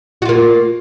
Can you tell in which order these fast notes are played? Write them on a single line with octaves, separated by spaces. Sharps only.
F#4 F4 A#3